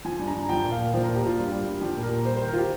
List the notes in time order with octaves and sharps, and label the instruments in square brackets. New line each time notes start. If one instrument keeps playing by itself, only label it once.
[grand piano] F3 G#5
G2
A#5
G2
F3 G5
A#2
F5
A#2
F3 C5
A#4
A#2
G4
A#2 F4
G2
G3
G2
F3 G4
A#2
A#4
A#2
G3 C5
C5
D#3
A#4
F4
G4